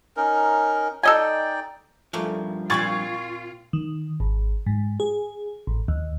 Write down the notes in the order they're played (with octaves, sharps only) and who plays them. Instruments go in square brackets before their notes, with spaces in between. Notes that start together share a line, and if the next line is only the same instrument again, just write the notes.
[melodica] C#4 D#4 A#4
[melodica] D#4 D5 G5 [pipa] A4 D#5 G#5
[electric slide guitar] G2 F3 [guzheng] A3 A#3
[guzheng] A#2 C4 B5 [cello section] F4 [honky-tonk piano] C#6 G#6 A6
[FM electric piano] D#3
G#1
G#2
G#4
A1
D#2